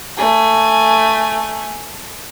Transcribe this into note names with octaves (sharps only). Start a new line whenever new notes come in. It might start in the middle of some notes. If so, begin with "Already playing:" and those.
A3 G#5